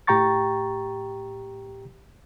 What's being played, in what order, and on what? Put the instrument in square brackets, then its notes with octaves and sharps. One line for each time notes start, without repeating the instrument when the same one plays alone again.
[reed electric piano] A2 G4 G5 A#5 C#6 A6